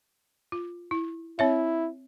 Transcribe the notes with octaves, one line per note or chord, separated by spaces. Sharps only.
F4
E4
C4 E4 C#5 E5